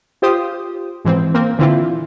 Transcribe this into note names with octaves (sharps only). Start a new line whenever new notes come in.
F4 G4 C5 D#6
G#2 E3 C4
A#3 C4 A#4
A#2 D3 E3 C4 E4 F4